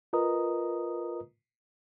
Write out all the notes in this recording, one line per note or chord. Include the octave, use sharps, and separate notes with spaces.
F4 A#4 B4 D#5 A#5 D#6